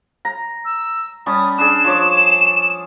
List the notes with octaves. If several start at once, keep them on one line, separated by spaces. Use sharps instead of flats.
A#5
E6
G3 C#4 A5 D#6
D4 G#4 E7
F3 C#5 D6 E7